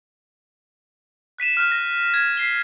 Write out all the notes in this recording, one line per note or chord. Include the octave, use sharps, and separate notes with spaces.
F#6 B6 D#7 E7
F6 F#6
A#6
G#6
B6 C7 G7